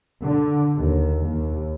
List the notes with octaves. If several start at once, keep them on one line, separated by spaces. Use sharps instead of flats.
D3
D#2
D#2